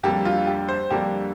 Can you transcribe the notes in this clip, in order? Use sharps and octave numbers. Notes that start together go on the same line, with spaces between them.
F2 D3 G3 A#3 D4 G4
F4
G4
C5
F2 D3 G3 A#3 D4 G4